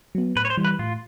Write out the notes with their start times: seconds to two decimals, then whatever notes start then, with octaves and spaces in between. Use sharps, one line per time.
0.15 F#3 B3
0.36 A2 B4
0.45 C#5
0.50 C5
0.57 E3 G3
0.64 B4
0.79 A2 F4